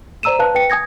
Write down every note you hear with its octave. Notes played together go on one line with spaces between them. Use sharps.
C5 D5 A#5 E6 D#7 E7
B4 F5 A5 F#6
B4 G5 C#7
G#5 D#6 G#6 A#6